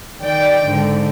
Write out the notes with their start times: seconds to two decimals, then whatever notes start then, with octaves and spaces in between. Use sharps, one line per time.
0.22 D#3 D5 G5
0.66 G#2 D3